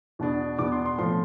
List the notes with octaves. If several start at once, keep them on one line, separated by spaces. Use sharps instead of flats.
E2 B2 B3 D4
E2 B2 B3 D4 D6
C6
C6
A2 F3 A3 C4 C6